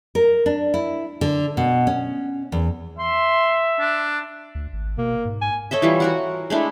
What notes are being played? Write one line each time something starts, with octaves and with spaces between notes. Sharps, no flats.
A#4
D4
E4
D3
B2
C#4
E2
E5 C6
D4
D2
G#1
B2 A#3
G#2
G#5
A4 C#5 D#5 E5
E3 G3 F4
F#4 A#4 F#5
G#3 A3 D4 E4